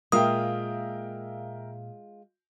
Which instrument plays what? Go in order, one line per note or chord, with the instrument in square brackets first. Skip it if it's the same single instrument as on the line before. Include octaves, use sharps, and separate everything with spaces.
[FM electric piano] A#2 F5 [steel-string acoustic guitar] G#3 F4 [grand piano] A#4 E5 G5 [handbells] D#6